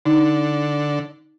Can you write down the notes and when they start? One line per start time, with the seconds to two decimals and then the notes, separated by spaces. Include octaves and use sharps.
0.05 D3 D#4